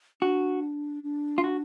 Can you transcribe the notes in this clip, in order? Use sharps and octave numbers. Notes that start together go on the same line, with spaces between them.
D4 F#4
D4
F4
F#4